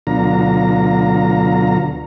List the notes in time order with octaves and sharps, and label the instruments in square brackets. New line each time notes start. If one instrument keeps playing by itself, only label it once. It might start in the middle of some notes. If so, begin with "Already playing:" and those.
[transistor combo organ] D2 B2 D3 F#3 F4 A#5